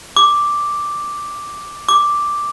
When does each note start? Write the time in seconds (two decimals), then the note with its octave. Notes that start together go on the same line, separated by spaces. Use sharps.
0.17 D6
1.89 D6